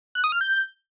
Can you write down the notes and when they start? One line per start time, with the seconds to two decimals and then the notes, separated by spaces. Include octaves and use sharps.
0.15 F#6
0.24 D#6
0.32 F6
0.41 G6